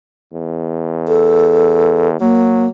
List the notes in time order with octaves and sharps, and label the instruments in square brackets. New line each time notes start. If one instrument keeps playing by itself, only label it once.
[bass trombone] E2
[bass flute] A4
[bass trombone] F#3 [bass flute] A#3